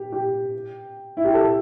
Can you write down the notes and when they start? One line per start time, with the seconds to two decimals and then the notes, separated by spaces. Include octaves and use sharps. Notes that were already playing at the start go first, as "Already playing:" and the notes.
Already playing: G4
0.12 G4
1.17 E4
1.24 G4
1.34 A4